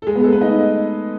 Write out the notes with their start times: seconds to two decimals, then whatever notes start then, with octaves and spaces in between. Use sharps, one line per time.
0.02 A4
0.07 G#3 G#4
0.15 B3 B4
0.24 A3 A4
0.32 B3 B4
0.41 D#4 D#5